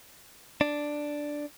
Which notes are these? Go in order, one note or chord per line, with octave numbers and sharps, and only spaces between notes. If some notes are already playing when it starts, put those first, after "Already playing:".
D4